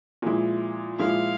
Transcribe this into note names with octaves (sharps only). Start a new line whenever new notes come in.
A#2 F3 G#3 E4
A#2 F3 G#3 E4 F5